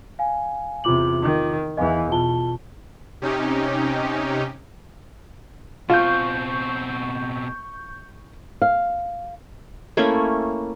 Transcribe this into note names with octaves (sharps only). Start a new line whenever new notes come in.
F5 G#5
E2 C3 F4 D6 F#7
D#3
E2 E3 D#5 F5 G#5
B2 F4 A5 G7
C3 C#4 D#4 G4
B2 C4 F4 C#6 G6
F5
A3 A#3 C#4 E4